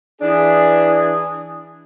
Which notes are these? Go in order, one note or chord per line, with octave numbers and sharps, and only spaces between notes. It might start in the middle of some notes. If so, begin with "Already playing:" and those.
E3 D4 G#4